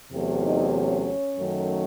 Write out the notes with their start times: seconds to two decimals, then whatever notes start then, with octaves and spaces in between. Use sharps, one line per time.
0.12 E2 C3 F#3 A3
0.43 D#4 D#5
0.75 C#4 C#5
1.37 F#2 D#3 F#3 A3